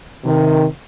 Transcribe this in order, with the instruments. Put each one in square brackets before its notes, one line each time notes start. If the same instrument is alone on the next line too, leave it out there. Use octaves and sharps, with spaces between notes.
[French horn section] C3 D#3